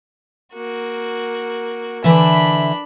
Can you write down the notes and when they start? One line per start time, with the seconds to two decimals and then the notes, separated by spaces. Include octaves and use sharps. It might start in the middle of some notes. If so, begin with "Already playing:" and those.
0.53 A#3 F#4
2.04 D3 E3 D4 E5 B5